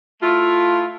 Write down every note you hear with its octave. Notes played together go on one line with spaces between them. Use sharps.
A3 E4 F4